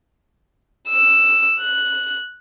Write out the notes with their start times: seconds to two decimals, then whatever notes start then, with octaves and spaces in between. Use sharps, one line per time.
0.89 E6
1.59 F#6